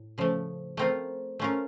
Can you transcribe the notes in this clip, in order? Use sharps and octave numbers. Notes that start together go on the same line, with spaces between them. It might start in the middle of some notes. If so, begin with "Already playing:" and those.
Already playing: A2
C#3 F3 A3
A3 C4 F4 A#4
A3 C#4 F4 A#4